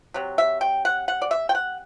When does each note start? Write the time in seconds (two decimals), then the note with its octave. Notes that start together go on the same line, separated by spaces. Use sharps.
0.14 C3 F#3
0.38 E5
0.61 G5
0.85 F#5
1.08 F#5
1.22 D5
1.31 E5
1.49 G5
1.55 F#5